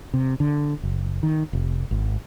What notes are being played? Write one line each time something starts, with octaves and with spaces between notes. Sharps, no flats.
C3
D3
F#1
D#3
F1
G#1